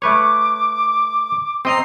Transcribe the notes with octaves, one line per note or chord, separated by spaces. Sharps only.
A3 B4 C#5 D6
C4 D#5 A#5 C7